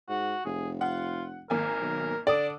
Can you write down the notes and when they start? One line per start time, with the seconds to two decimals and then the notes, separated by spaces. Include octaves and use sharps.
0.09 G#2 F#4
0.45 F1 G#4
0.81 F4 F#5
1.50 G#1 A#3 A#4 G#5
1.81 B1
2.27 D3 D4 A4 D5 D#6